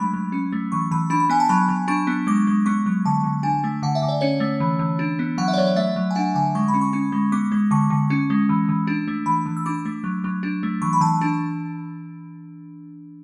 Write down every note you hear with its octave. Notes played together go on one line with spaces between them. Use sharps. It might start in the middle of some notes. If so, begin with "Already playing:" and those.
Already playing: F#3 G#3 A3 D4 B5
F#3
C#4
A3
E3 C#6
E3 B5
D4 B5
B5
B3 G#5
A5
F#3 B5
F#3
D4 C#6
B3
G#3 D6
G#3
B3 C#6
F#3
D3 A5
D3
D4 G#5
A3
D3 F#5
E5
D3
D5
C#4 C#5
A3
E3
E3
D4
B3
F#3 F#5
E5
D5
F#3 C#5
D5
A3 E5
F#3
G#5
D4 F#5
D3 G#5
G#3 C#6
B5
C#4
C#6
C#4
G#3
B3 D6
G#3
D3 C#6
D3
C#4
G#3
E3
E3
D4
A3
E3 B5
E3
E6
D4 D6
A3
F#3
F#3
D4
A3
E3 C#6
B5
E3 A5
D4